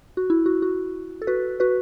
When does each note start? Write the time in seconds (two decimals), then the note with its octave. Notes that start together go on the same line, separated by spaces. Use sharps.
0.17 F#4
0.30 E4
0.46 F#4
0.62 F#4
1.22 A4
1.27 F#4 B4
1.60 F#4 B4